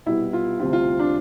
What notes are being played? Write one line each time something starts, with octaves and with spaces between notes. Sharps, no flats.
C2 B2 G3 B3 E4
F4
D2 C3 G3 C4 F4
F4
D4